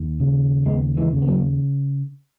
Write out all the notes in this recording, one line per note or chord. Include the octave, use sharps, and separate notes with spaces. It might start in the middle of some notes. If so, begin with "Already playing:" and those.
Already playing: D#2
C#3
D#2 G#3 B3
E3 G#3
C#3
B3
F#3 A#3